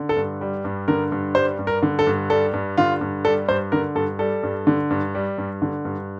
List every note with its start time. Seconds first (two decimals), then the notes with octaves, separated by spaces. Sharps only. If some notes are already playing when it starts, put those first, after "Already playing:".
Already playing: D3
0.09 A4
0.16 G2
0.41 G3
0.65 G2
0.88 D3 A#4
1.12 G2
1.35 G3 C5
1.59 G2
1.67 A#4
1.83 D3
1.99 A4
2.07 G2
2.30 G3 A4
2.53 G2
2.77 D3 F4
3.01 G2
3.25 G3 A4
3.48 G2 C5
3.72 D3 A#4
3.95 G2 A4
4.19 G3 A4
4.43 G2
4.67 D3
4.90 G2
5.15 G3
5.38 G2
5.62 D3
5.85 G2